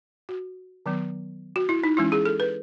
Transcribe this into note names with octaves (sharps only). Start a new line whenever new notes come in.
F#4
D#3 F#3 B3
F#4
E4
D#4
E3 G#3 C#4 E4
G#4
A4
B4